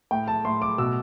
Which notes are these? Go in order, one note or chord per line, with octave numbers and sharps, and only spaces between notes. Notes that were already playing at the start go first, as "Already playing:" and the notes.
A2 G5
A5
A2 C6
D6
B2 E6